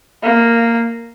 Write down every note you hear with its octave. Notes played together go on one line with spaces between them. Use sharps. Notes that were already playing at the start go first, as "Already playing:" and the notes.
A#3